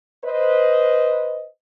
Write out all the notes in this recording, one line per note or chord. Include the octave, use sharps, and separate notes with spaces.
B4 C5 D#5